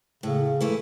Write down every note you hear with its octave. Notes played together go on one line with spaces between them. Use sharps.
A2 C#3
E3 A3 E4